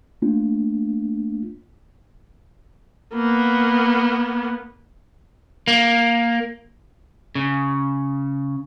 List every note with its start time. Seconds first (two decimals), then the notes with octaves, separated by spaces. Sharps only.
0.22 A3 A#3 D4 F4
3.14 A#3 B3
5.68 A#3
7.35 C#3